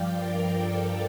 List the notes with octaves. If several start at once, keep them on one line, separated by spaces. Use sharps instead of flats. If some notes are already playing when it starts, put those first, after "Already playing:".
Already playing: G2 F3 D5 F5 G5
A#4
A4